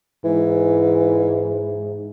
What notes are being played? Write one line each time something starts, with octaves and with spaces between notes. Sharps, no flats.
G#2 E3